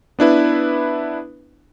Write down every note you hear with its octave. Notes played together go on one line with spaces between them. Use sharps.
B3 D4 E4 B4